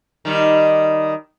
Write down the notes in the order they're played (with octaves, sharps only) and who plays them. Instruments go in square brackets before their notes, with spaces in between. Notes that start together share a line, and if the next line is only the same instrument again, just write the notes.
[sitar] D#3 G3